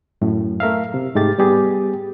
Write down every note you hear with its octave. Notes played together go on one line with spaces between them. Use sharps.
F#2 A2
A3 A#4 E5 F5
C3
G#2 G#3 A3 G4 A6
G3 B3 G4 G#4